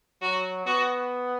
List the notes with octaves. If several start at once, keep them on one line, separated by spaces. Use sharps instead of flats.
F#3 F#4
B3 F#4